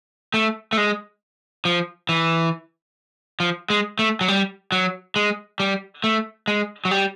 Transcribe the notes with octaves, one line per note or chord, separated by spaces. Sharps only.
A3
A3
G#3
F3
E3
F3
G#3
A3
F#3
G3
F#3
G#3
G3
A3
G#3
F#3
G3